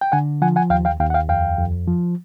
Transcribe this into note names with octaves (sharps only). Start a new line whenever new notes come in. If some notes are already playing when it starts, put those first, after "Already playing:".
G5
D3 F#5 G#5
F3 F#5 G#5
F#5 G#5
D#2 F5 G5
F5 G5
D#2 F5 G5
F#5
F5 G5
F2 F5 G5
F2
F3